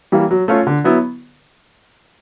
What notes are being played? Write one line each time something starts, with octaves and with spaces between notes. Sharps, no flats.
E3 G3 A#3
F#3
A3 C#4 F4
D3
F#3 B3 E4